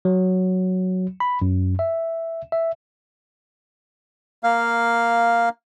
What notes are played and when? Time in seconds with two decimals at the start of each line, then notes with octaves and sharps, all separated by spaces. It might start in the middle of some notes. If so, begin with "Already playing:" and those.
0.05 F#3
1.20 B5
1.42 F#2
1.79 E5
2.52 E5
4.43 A#3 F5